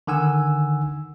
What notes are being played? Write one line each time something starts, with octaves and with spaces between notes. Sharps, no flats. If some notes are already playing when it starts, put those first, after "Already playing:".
D3 D#3 F#5 G#5 E6